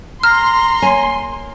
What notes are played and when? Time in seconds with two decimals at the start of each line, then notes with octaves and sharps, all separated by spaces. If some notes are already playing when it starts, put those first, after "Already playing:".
0.23 A#5 C6 F6
0.82 A#3 C#5 G#5